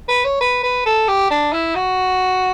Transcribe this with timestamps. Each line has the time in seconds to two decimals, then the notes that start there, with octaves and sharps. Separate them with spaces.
0.08 B4
0.25 C#5
0.41 B4
0.63 B4
0.86 A4
1.08 G4
1.30 D4
1.53 E4
1.75 F#4